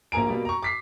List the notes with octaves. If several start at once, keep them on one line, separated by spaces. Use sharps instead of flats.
A#1 A#3 A#4 G#5 A#5 D7
B2 G3 A#3
A#5 C#6
D6 B6 C7